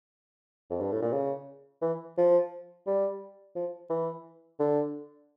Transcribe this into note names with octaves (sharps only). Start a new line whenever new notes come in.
F2
G2
A2
A#2
C#3
E3
F3
G3
F3
E3
D3